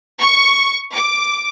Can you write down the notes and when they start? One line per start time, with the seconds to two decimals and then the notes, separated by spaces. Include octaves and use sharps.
0.19 C#6
0.94 D6